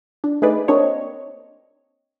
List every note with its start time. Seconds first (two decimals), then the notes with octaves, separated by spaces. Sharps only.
0.24 D4
0.42 A3 D#4 G#4 B4 D5
0.68 A#3 C4 D4 C#5 D#5